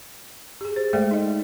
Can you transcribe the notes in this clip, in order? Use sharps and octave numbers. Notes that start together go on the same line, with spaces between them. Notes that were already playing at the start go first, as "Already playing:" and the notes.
G4 G#4
C5
G#3 A3 A4 D5 E5 G5
D#4 D#5